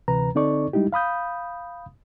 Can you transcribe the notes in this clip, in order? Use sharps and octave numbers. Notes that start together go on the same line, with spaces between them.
D2 C3 E3 B4 A#5
D3 C4 D#4 A4 D5 C#6
G3 G#3 D#4 E4 G4
F5 B5 D#6 G6